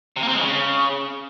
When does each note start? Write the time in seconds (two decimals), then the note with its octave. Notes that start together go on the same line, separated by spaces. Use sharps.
0.16 C3
0.22 A#3
0.28 C4
0.34 G#3
0.40 C#3